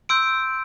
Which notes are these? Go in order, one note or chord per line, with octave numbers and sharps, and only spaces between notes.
C6 E6 G6 D7